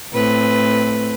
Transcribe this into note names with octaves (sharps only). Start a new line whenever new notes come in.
A2 C4 B4